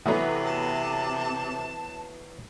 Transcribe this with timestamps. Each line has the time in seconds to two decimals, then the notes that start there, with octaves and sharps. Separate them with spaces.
0.06 C3 E3 F#3 A3 B3
0.45 A5